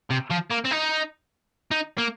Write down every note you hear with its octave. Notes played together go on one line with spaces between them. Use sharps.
C3
F3
A#3
C4
D#4
D#4
A#3